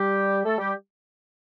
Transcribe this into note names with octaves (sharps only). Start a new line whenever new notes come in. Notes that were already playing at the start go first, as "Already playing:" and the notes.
Already playing: G3 G4
A3 A4
G3 G4